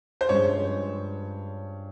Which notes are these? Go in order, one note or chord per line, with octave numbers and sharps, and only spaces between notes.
C5
G2 F3 G#3 C#4 C#5